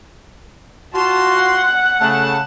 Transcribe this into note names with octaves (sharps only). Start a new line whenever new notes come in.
F4 F#4 A5 C6
F#5
C#3 A3 A5